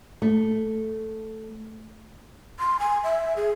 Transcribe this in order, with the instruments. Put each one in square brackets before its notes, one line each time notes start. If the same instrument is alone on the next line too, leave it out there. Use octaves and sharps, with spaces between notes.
[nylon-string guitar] A3
[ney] C6
G#5
E5
G#4